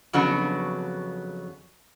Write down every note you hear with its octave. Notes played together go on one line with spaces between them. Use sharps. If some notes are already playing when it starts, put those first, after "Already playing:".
F2 C#3 F#3 B3 D4 F#4